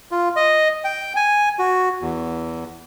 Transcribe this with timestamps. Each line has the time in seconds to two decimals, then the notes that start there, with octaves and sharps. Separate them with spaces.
0.11 F4
0.36 D#5
0.84 G5
1.16 G#5
1.59 F#4
2.02 E2